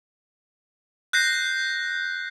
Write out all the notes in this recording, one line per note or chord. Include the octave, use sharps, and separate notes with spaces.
F#6 G6 A#6 C7